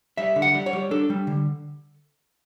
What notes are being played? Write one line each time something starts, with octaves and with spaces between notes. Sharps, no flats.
G3 E5
D3
F#5
G3
C#5
G3
D4 A4
G3
D3